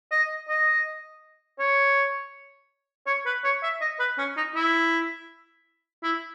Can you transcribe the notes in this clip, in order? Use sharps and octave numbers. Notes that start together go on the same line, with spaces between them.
D#5
D#5
C#5
C#5
B4
C#5
E5
D#5
B4
C#4
D#4
E4
E4